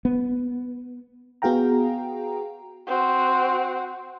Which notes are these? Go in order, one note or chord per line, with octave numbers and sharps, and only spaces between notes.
B3
B3 F#4 G#4 F5 G5 A#5
C4 F#4